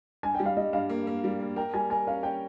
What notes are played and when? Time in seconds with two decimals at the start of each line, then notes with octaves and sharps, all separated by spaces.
0.23 G2 G#5
0.35 G5
0.40 G3
0.46 F5
0.57 G3 D#5
0.73 G2 F5
0.90 A#3
1.07 A#3
1.24 G3
1.40 A#3
1.56 A#4 G5
1.74 G3 G#5
1.90 A#4 G#5
2.07 C#4 F5
2.23 C#4 G5